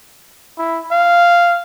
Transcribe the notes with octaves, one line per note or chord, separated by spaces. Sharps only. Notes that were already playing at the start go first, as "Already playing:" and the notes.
E4
F5